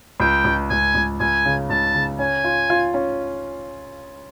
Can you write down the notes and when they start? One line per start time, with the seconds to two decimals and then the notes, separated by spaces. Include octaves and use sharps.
0.20 C#2 G5
0.45 C#2
0.70 C#2 G#5
0.95 C#2
1.20 C#2 G#5
1.45 C#3
1.70 C#2 A5
1.94 C#3
2.19 C#4 G#5
2.44 F4
2.70 F4
2.94 C#4